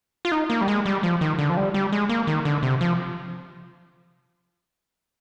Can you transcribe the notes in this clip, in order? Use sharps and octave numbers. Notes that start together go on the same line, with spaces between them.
F4
D#4
A#3
G3
G#3
G3
F3
D#3
D3
F3
G3
G3
G#3
A#3
D#3
D3
C3
F3